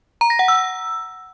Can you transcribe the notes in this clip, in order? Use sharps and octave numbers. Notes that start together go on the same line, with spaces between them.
A#5
A#6
F#5
E6